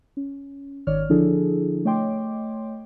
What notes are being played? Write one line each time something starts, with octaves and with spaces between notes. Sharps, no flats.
C#4
G#1 D#3 C#5 D5 F6
D3 F3 D4 E4 G#4 A4
A3 C#5 D#5 G5 C6 D6